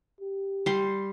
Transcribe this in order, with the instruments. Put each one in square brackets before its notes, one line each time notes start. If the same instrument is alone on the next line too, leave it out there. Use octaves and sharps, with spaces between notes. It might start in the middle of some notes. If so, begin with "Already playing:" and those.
[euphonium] G4
[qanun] G3 C6